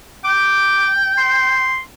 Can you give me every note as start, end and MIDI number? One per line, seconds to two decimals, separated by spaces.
0.25 1.75 79
0.25 0.89 86
1.18 1.80 84